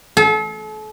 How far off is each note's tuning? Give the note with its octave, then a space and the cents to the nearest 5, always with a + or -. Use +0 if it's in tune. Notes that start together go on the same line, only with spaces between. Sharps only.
A4 -40